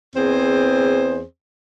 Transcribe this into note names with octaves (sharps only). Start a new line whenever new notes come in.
E2 C4 G#4 C5